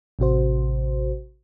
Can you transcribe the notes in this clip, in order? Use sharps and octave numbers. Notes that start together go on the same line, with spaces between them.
A1 C3 F#4 C5